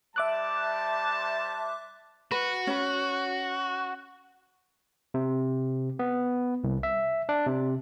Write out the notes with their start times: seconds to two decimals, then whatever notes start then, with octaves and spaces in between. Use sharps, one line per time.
0.16 G3 C5 E5 A5 D6 F#6
2.31 F#4 B4
2.67 C#4 B4
5.14 C3
5.99 B3
6.64 C2
6.83 E5
7.29 D4
7.47 C3